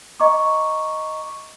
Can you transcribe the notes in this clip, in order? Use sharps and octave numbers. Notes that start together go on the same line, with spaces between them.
D#5 A#5 C#6 D6